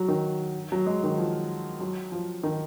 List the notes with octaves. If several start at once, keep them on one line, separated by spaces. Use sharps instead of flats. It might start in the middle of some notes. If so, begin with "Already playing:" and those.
Already playing: F#3
D#3
F#3
G#3
D#3
F3
F#3
F3
D#3